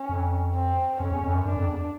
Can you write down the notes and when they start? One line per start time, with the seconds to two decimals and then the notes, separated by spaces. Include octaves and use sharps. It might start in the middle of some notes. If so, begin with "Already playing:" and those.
Already playing: C#4
0.09 F2
0.54 C4
1.00 F2 C#4
1.11 E2
1.23 F2
1.34 F#2
1.46 F#2 D4
1.57 F2
1.68 E2